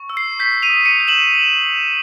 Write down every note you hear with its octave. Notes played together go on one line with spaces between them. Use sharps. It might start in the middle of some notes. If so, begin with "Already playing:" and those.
Already playing: C#6
E6
C7
G6 B6
D#7 F7
D#6
C#7 D#7
G6
E7 F#7